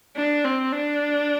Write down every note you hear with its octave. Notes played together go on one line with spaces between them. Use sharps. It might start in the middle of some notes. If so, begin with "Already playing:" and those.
D4
C4
D4